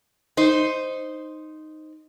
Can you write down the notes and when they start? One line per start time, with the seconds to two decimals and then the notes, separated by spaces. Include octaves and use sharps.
0.37 D#4 C5